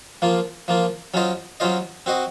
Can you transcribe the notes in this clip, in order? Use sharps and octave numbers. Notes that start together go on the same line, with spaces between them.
F3 A#3 F4
F3 A#3 F4
F#3 C#4 F4 C5 D#5
F#3 C#4 F4 C5 D#5
C4 F#4 C5 D#5